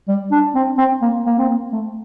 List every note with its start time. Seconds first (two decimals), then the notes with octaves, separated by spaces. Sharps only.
0.08 G3
0.32 D4
0.55 C4
0.78 C4
1.02 A#3
1.26 A#3
1.38 C4
1.49 A#3
1.72 A3